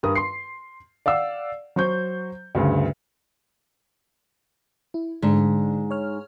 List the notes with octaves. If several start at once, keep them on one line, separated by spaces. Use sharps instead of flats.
G2 A#4 D#6
C6 C7
D5 F5 F#5 E6
F#3 C5 C#6 G6
D2 G2 C#3
E4
G#2 D3 D4
C#5 F6